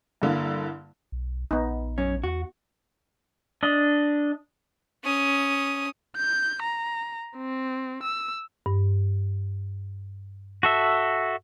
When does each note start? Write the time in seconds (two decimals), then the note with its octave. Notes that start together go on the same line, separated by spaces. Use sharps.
0.22 G2 D3 A#3 E4
1.12 B1
1.51 A#1 B3 D#4
1.98 F#2 C#4
2.24 E2 F#4
3.63 D4 D#5
5.04 C#4 D#6
6.17 G6
6.62 A#5
7.37 C4
8.03 E6
8.66 G2
10.63 F#4 A4 E5